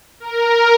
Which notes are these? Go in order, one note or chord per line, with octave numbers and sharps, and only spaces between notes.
A#4